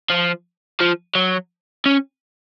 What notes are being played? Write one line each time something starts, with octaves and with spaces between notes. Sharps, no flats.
F3
F3
F#3
C#4